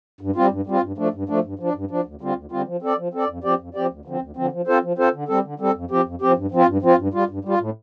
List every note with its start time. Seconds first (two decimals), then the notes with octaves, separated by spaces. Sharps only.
0.21 G2
0.36 G3 C4 F4
0.51 G2
0.67 G3 C4 F4
0.82 G2
0.98 F3 A3 D4
1.14 G2
1.29 F3 A3 D4
1.44 G2
1.59 F3 D4
1.75 G2
1.91 F3 D4
2.05 D2
2.21 D3 G3 C4 F4
2.36 D2
2.52 D3 G3 C4 F4
2.67 F3
2.82 C4 A4 D5
2.98 F3
3.14 C4 A4 D5
3.29 F2
3.44 F3 C4 G4 D5
3.59 F2
3.75 F3 C4 G4 D5
3.91 D2
4.05 D3 F3 C4
4.21 D2
4.36 D3 F3 C4
4.52 F3
4.67 C4 F4 A4 C5
4.83 F3
4.98 C4 F4 A4 C5
5.14 D3
5.28 G3 C4 A4
5.44 D3
5.60 G3 C4 A4
5.75 F2
5.91 F3 C4 G4
6.05 F2
6.21 F3 C4 G4
6.36 G2
6.52 F3 C4 F4
6.68 G2
6.82 F3 C4 F4
6.98 G2
7.13 G3 F4
7.29 G2
7.45 G3 F4
7.60 A2